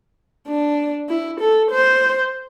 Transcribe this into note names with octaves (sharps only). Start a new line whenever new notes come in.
D4
E4
A4
C5